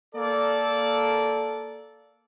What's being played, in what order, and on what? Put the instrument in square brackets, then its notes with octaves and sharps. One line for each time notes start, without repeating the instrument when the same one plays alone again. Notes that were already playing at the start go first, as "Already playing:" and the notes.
[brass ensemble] A#3 A4 D5